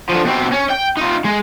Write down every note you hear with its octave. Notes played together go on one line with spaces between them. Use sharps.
D3 F3
B2 C4
C#4
G5
D#4 F4
G#3